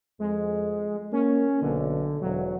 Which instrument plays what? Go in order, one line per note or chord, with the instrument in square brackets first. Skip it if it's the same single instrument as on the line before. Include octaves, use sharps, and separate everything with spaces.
[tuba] F2 [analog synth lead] G#3
[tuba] A#3 [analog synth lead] C#4
[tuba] B1 [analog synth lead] D3
[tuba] E1 [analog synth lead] F#3